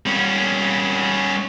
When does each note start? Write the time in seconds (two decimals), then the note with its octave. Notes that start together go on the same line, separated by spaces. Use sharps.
0.06 G3 C#4